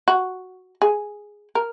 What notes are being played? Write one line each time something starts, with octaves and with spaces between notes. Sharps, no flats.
F#4
G#4
A#4